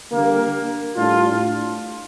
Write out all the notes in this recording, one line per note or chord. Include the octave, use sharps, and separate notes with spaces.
D3 G3 A#3
A2 G3 D4 F4